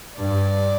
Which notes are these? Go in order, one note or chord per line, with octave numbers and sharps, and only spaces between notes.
G2 D5